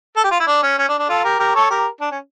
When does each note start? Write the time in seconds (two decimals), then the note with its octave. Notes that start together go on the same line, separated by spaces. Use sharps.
0.16 A4
0.24 G4
0.31 F4
0.40 E4
0.47 D4
0.63 C#4
0.79 C#4
0.88 D4
0.99 D4
1.09 F4 A4
1.24 G4 A#4
1.39 G4 A#4
1.55 A4 C#5
1.70 G4 A#4
2.01 D4
2.11 C#4